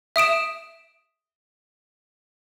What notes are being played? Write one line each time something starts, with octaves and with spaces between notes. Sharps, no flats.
E5 D#6 D7 E7